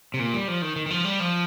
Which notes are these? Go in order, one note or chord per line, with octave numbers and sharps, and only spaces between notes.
C3
A#2
G3
F3
D#3
D#3
D#3
F3
G3
F3